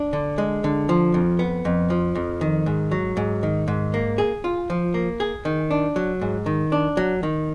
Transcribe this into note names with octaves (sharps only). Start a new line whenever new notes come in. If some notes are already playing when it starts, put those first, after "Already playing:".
Already playing: D4
D3
G#3
D3
F3
F2
B3
F2
F3
F2
D#3
G#2
F#3
G#2
D#3
G#2
A#3
G#4
F4
F3
A#3
G#4
D#3
D4
F#3
G#2
D#3
D4
F#3
D#3